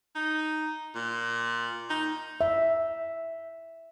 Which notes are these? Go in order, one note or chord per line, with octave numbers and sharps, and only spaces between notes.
D#4
A#2
D#4
E5